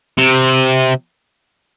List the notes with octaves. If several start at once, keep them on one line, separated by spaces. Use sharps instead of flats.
C3